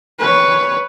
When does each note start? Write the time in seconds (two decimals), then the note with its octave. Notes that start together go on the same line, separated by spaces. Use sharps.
0.19 B4 C#5